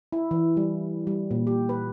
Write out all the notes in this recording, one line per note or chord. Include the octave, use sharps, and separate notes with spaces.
E4
E3
G3
G3
A#2
G4
B4